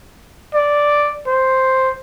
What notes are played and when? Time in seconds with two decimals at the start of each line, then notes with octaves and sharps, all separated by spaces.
0.55 D5
1.27 C5